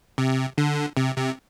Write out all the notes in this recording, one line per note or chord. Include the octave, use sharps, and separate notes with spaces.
C3
D3
C3
C3